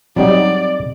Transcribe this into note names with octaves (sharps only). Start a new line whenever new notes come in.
F#3 G3 C4 D#4 D5 F#5